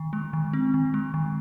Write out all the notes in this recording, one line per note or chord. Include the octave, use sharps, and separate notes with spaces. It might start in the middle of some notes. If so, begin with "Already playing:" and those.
Already playing: D#3
G#3
D#3
C4
D#3
G#3
D#3